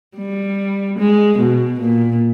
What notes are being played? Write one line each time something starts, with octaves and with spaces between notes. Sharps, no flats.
G3
G#3
B2
A#2